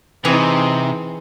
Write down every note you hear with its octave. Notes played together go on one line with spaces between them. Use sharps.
C3 E3 C4 D#4 G#4